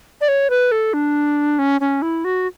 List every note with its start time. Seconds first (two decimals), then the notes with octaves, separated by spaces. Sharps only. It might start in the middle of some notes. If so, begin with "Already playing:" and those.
0.21 D5
0.28 C#5
0.50 B4
0.72 A4
0.94 D4
1.59 C#4
1.81 C#4
2.02 E4
2.25 F#4